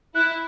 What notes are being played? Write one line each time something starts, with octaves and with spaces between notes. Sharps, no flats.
E4 F#6